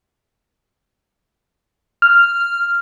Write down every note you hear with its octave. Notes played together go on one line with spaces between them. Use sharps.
F6